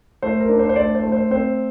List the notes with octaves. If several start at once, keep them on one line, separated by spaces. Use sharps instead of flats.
A3 C5
A#4
D4
C5
C5
A3 D5
C5
A3
C5
C4 C5